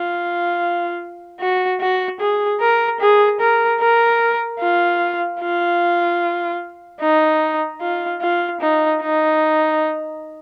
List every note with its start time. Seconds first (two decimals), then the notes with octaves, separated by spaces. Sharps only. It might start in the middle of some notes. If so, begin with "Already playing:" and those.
Already playing: F4
1.40 F#4
1.81 F#4
2.20 G#4
2.61 A#4
3.00 G#4
3.40 A#4
3.80 A#4
4.60 F4
5.41 F4
7.01 D#4
7.81 F4
8.21 F4
8.61 D#4
9.01 D#4